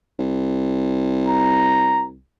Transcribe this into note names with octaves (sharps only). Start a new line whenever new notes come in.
C2
A#5